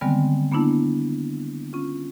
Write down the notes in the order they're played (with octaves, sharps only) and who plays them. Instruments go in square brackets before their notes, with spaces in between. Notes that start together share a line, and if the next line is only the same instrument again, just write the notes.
[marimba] D3 D#3 G3 G#3 B3 C4
A#3 B3 D4 E4 A5
C#4 F4